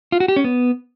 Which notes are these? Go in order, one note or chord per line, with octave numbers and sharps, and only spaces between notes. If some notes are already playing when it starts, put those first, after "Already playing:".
F4
F#4
G4
C#4
B3